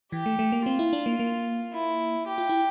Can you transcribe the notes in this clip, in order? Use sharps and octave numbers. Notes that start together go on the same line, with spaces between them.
E3 G4
A3
A3
A#3
C4 F4
E4
D4
A#3
A#3
E4
G4
F4
E4